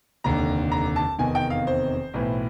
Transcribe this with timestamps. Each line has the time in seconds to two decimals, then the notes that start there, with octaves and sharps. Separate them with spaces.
0.24 F1 D#2 D3 A#5
0.72 A#5
0.96 A5
1.18 F1 E2 C3 D#3 G#5
1.35 G5
1.50 F5
1.67 C5
2.14 B1 A2 E3